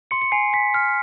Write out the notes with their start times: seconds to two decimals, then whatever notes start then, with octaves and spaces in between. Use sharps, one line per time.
0.11 C6 C#7
0.22 C#7
0.32 G#5 C7
0.53 G#5 B6
0.74 F6